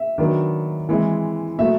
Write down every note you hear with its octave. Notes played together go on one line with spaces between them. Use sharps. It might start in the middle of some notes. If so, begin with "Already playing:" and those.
Already playing: E5
D#3 F#3 B3 D4
E3 G#3 C4 E4
B2 F#3 A3 E5